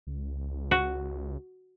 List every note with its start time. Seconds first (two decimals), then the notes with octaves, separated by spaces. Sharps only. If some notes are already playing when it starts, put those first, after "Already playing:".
0.07 C#2
0.71 F#4